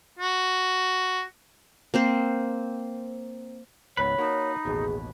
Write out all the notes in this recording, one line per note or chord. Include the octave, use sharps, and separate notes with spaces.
F#4
A#3 C4 C5
C#2 G#2 B3 B4 C#5
A#3 D#4 F#4 A#4
A1 D#2 B2 G#4